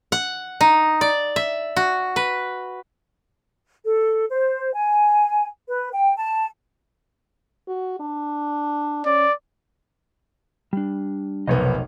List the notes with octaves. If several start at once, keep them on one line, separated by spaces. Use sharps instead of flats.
F#5
D#4
D5
E5
F#4
B4
A4
C5
G#5
B4
G5
A5
F#4
D4
C#4 D5
G3 D4
F1 B1 B3 A#4 C#5 D#5